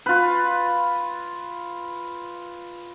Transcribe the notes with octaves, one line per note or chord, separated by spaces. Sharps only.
F4 B4